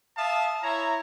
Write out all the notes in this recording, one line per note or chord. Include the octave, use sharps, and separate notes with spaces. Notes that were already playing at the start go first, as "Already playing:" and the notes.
E5 F5 A5 D#6
E4 C#5 A#5